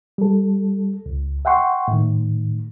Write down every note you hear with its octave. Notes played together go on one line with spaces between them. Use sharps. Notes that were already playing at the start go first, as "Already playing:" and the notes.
G3 A4
C#2
E5 F#5 G5 C6 C#6
A2 D#3